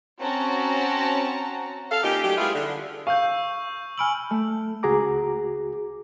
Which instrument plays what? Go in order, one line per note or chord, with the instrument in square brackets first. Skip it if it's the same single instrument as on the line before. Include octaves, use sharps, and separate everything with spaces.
[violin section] C4 C#4 F#4 A5 A#5
[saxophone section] A4 F5
A#2 C#4 D#4 G4
F#3 A3 D4 G4
G3 A3 B3 E4 F4 G#4
D3
[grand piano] F5 [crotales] C#6 E6 G6
[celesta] G#5 B5 E6 [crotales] F6 D7 F#7
[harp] A3
[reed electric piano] C#2 F#4 G#4 A#5 D6